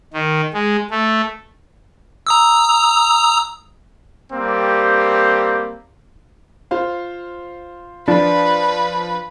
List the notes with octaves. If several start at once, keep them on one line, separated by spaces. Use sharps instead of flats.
D#3
G#3
A3
A#5 D#6 E6
G3 A#3 C4 G4
F4 C5 F5
F3 D4 B4